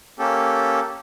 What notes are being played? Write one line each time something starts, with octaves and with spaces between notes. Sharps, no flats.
A#3 C#4 G4 A4